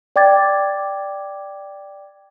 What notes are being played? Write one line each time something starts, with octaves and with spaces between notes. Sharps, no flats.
D5 G5 D6 G#6 A6